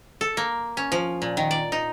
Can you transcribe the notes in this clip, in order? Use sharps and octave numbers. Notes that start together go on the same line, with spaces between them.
A4
A#3
C#4
F3
A#2
D#3
D5
D#4